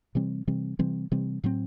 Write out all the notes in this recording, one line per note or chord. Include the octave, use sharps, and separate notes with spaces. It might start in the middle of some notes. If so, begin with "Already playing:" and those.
C3 E3 G3 C4
C3 E3 G3 C4
C3 E3 G3 C4
C3 E3 G3 C4
A2 F#3 C4